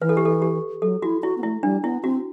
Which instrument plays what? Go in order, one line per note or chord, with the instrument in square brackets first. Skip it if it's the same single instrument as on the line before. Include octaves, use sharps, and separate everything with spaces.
[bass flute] E3 [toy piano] B4
[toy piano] A4
G4
A4
G4
[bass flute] F#3 [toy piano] A4
[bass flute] E4 [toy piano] F#4
[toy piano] E4 [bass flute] F#4
[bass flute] B3
[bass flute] A3 [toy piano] E4
[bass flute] G3 [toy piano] D4
[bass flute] B3 [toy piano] E4
[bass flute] C4 [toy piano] F#4